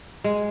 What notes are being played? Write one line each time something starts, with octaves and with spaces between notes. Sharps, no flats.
G#3